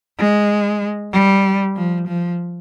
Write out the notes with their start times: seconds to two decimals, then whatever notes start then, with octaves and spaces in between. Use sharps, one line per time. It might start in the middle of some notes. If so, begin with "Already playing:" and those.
0.18 G#3
1.13 G3
1.76 F3
2.08 F3